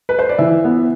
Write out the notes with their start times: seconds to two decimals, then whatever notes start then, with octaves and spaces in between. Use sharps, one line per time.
0.09 B4
0.19 C5
0.29 D5
0.38 E3 E5
0.64 B3